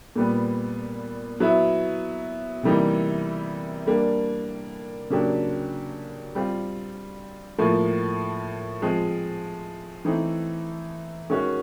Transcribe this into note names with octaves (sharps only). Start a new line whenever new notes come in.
A#2 G3 B3
F#3 B3 E4
C3 E3 G3 A#3 D#4
G3 A#3 D4
C#3 F#3 A#3 D4 G4
G3 C4 F4
A2 F3 A#3
F3 G#3 C4
E3 A3 C4 D#4
D#3 G#3 C#4 F#4